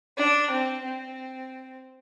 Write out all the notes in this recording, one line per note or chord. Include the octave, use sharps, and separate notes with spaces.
D4
C4
C4